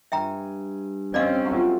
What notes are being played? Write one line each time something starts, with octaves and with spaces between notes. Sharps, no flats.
G2 E5 G5 G#5 A#5
C4 C#4 D5 D#5 F5
F#3 A3 F4